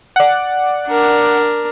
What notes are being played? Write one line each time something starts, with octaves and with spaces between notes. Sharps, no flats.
D5 F#5
D4 A#4